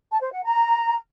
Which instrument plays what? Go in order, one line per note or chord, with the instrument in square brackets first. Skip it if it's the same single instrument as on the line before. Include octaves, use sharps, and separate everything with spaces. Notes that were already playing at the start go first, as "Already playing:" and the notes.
[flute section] A5
C5
F#5
A#5